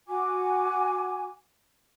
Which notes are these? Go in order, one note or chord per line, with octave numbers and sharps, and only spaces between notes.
F#4 G#5 D6